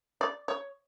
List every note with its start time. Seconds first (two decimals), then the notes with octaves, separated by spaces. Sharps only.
0.21 D5
0.48 C#5